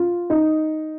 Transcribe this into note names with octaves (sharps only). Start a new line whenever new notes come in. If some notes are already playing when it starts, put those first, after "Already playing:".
Already playing: F4
D#4